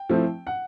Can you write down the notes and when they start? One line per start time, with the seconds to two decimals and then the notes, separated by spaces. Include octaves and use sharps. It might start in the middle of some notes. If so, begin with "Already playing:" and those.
Already playing: G5
0.09 F3 A3 C4 E4
0.47 F#5